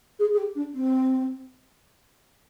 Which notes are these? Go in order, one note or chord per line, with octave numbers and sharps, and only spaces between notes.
G#4
G#4
G4
D4
C4